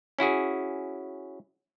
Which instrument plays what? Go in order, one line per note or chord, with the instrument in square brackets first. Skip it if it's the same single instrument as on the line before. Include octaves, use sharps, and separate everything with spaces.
[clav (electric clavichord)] C#4 E4 F#4 G#4